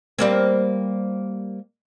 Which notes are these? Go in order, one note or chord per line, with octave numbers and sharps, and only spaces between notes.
G3 A#3 C4